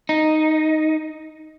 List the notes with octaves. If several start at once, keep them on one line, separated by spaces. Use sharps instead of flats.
D#4